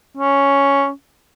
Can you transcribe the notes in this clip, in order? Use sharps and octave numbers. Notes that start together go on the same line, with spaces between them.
C#4